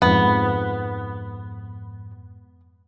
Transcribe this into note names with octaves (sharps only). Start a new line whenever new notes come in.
F2 G#2 B3